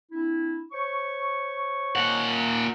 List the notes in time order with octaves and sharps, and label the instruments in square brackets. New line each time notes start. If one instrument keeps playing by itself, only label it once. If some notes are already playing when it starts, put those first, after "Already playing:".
[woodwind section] C4 D4 E4
C5 C#5 C#6
[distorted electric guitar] A#2 F#5